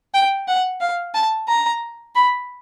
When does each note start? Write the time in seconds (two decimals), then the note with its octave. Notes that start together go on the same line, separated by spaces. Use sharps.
0.14 G5
0.48 F#5
0.81 F5
1.15 A5
1.48 A#5
2.15 B5